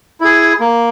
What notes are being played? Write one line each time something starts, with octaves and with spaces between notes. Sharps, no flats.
E4 G#4
A#3